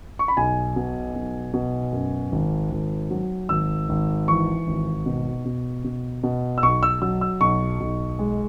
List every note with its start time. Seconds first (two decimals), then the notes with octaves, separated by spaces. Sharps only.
0.19 C#6
0.28 B5
0.37 B1 G#5
0.76 B2
1.16 B1
1.54 B2
1.93 F#2
2.32 G#1
2.72 G#1
3.11 F#3
3.49 G#1 E6
3.89 G#1
4.28 E3 C#6
4.67 G#1
5.06 B2
5.45 B2
5.84 B2
6.23 B2
6.58 E6
6.63 B1 C#6
6.83 E6
7.02 F#3 E6
7.21 E6
7.41 B1 C#6
7.80 B1
8.19 G#3